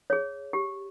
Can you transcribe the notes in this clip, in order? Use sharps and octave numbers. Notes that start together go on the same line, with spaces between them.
G#4 C#5
G4